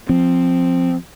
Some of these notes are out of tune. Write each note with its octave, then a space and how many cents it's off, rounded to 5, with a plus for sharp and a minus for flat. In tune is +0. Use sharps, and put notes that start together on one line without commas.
F3 +0 C4 +0